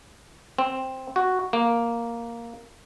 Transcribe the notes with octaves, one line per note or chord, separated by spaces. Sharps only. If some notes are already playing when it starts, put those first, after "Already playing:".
C4
F#4
A#3